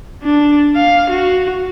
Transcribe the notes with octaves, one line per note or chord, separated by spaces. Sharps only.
D4
F5
F#4